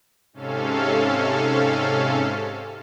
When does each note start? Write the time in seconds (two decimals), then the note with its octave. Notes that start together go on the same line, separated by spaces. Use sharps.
0.33 G#2 C3 C#4 A4 F5